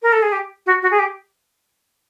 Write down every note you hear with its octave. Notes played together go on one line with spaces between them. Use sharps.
A#4
A4
G#4
G4
F#4
F#4
G#4
G4